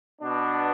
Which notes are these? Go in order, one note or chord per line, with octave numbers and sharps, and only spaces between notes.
B2 B3 D4